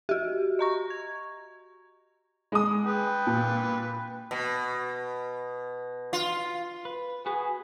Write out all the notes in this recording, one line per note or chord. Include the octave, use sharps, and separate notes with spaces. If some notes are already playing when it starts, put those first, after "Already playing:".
F#4 G4
D#5 A#5 C#6
G#6
G#3 D#6
B4 G5
A#2
B2
F4
B4
F#4 G#4 B4